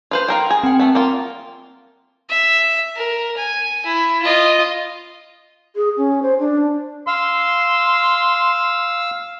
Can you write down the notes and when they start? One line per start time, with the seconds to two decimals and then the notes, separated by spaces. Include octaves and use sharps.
0.11 F4 B4 C5
0.28 F4 A#4 G5
0.50 G#4
0.64 C4 G5
0.79 A3 B3
0.95 A#3 F4
2.29 E5
2.96 A#4
3.37 G#5
3.85 E4
4.22 F4 D#5
5.76 G#4
5.97 C#4
6.23 C5
6.39 D4
7.07 F5 C6 E6